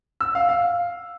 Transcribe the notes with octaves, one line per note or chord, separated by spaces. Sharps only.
E6
F5
F5